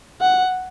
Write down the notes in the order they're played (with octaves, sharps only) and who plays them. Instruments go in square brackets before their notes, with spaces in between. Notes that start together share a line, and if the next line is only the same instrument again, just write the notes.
[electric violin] F#5